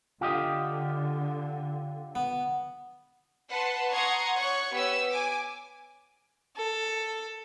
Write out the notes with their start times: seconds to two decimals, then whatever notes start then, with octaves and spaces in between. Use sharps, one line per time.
0.21 D3 F4 G4 D#5
2.15 B3
3.49 B4 F#5 A5 C6
3.92 F#5 A#5 C6 C#6 D#6 G#6
4.37 C#5 C#6 F#6 G#6
4.73 B3 G4 B4 C#5 E6
5.11 G#5 D6
6.56 A4